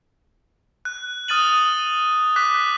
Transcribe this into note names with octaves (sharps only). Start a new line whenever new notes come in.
F#6
D#6 F6 A6 D#7 F#7
D6 F#6 B6